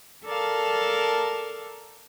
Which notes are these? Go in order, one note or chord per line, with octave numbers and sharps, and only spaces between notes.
A4 A#4 D5 F5 A5